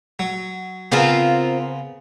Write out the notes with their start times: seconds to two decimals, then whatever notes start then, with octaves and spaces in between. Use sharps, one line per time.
0.19 F#3
0.92 C#3 B3 C4 F4 A#4